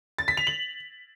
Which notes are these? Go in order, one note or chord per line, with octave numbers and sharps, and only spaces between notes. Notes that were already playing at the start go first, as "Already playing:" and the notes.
A6
B6
F7
F#7